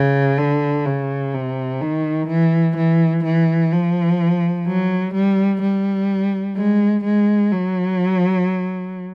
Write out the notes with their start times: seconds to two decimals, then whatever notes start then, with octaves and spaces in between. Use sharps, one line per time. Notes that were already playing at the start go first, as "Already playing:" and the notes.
Already playing: C#3
0.38 D3
0.85 C#3
1.34 C3
1.81 D#3
2.28 E3
2.77 E3
3.24 E3
3.72 F3
4.66 F#3
5.14 G3
5.61 G3
6.56 G#3
7.04 G#3
7.51 F#3